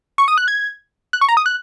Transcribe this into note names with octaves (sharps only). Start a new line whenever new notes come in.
C#6
D#6
F#6
G#6
F#6
C#6
A#5
D#6
F#6